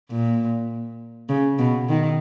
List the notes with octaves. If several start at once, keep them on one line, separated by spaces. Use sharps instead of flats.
A#2
C#3
B2
D#3